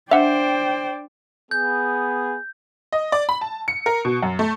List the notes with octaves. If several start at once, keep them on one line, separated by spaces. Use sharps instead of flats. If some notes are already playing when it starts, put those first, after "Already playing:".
D4 C5 D5 E5 F#5 G5
B3 G#4 G6
D#5
D5
B5
A5
C#7
A#4
B2
F#2
A3